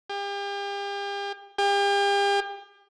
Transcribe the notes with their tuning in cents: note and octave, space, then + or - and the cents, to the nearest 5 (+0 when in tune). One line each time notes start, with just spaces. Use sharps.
G4 +40
G4 +40